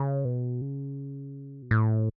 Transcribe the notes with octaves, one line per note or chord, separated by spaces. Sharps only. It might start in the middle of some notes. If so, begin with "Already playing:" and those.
Already playing: C#3
B2
C#3
B2
A2